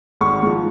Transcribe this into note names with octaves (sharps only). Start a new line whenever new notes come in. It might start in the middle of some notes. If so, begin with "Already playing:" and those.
G#1 C#6
G#2 F3